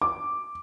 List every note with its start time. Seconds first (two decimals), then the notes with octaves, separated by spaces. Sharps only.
0.02 D6